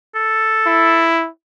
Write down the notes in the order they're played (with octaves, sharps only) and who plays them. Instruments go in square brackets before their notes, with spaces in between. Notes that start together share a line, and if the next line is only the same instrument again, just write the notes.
[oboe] A4
[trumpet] E4